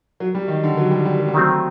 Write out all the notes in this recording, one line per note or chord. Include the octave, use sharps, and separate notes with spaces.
F#3
G3
D#3
D3
F#3
G3
G3
F#3
G3
D#3 F#3 A3 C4